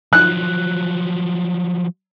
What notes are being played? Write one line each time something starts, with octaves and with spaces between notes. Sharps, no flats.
F3 F#3 F#6